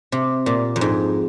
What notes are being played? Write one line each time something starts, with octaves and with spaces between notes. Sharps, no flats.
C3
A#2
F2
G#2